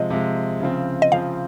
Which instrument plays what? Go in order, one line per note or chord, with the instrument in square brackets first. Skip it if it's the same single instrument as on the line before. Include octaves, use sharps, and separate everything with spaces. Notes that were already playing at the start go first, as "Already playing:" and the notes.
Already playing: [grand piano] C3 F3 G#3 [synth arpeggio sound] D#5
[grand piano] C3 F3 G#3
C#3 F3 C4
[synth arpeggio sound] D#5
[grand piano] C#3 F3 C4 [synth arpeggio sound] F5